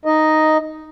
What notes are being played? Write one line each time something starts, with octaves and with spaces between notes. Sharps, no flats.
D#4 D#5